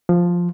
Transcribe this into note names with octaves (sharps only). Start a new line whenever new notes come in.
F3